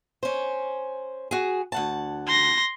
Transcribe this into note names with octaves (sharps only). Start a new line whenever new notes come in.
C#4 C5
F#4 G#4
D2 F#5 A5
C6 A#6